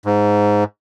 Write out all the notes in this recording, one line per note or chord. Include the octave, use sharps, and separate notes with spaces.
G#2